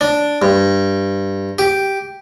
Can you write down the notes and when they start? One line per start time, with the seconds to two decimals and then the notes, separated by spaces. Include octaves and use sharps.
0.01 D4
0.42 G2
1.59 G4